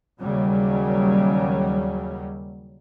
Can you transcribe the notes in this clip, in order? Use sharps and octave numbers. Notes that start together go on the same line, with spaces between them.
D#2 C#3 F#3 G3